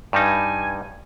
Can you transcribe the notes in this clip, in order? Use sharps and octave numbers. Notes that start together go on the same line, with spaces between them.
G2 G3 D#4 G#5